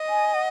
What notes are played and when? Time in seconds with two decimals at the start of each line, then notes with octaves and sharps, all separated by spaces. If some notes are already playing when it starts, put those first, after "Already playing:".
Already playing: D#5
0.09 G#5
0.34 F#5